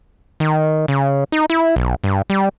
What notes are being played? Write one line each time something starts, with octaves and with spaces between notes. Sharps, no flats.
D#3
C#3
D#4
E4
B1
G2
G3